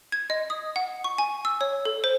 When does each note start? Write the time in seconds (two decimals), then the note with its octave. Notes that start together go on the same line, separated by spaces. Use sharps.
0.12 G#6
0.30 D#5
0.50 D#6
0.76 F#5
1.04 C#6
1.18 G#5
1.45 E6
1.61 C#5
1.85 A4
2.04 C5